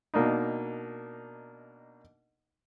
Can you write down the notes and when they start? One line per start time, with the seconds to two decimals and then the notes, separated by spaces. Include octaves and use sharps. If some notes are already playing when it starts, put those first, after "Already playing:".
0.14 B2 A#3 D4 D#4